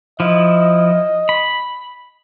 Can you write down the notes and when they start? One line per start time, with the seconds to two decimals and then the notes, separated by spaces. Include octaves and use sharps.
0.20 F3 E4 D#5
1.29 B5